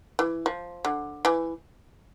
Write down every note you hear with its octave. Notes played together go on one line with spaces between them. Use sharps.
E3
F3
D3
E3